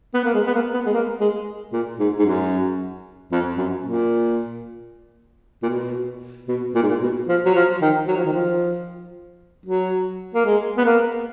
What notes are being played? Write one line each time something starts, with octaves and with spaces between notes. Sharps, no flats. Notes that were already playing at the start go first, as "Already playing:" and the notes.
B3
A#3
G#3
B3
A#3
B3
G#3
A#3
G#3
A#2
G#2
G#2
F#2
F2
F#2
A#2
A#2
B2
B2
A#2
G#2
A#2
B2
F3
F#3
F3
D#3
F#3
F3
D#3
F3
F#3
A#3
G#3
B3
A#3